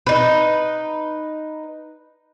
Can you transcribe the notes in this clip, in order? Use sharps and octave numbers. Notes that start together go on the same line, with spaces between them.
D#4 B4